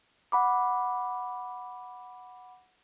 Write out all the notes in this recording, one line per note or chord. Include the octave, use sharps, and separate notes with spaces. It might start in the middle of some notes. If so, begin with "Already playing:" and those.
F#5 B5 D6